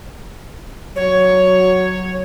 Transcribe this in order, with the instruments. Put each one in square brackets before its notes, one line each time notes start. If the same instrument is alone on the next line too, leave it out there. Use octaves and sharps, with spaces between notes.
[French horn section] F#3 [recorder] C#5